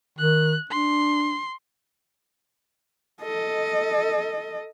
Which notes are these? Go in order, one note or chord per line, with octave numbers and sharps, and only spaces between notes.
D#3 F#6
D4 C6
A4 D#5